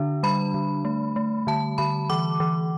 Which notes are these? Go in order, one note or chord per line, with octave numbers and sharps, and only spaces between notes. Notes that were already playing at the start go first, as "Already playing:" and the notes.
Already playing: D3 D4
G3 B5
D3
A3
A3
D3 A5
D3 B5
E3 D6
E3